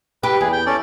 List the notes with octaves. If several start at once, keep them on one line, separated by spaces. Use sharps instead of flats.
G4 B4
E2 G#4
G5
C#4 A4 D5